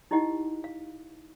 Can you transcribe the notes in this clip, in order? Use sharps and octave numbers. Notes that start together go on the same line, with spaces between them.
D#4 E4 G4 D#5 F#5
F5